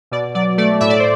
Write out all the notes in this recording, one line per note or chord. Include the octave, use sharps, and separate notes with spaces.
B2 D5
F#3 D5
A3 D5
A2 E5
D5
C5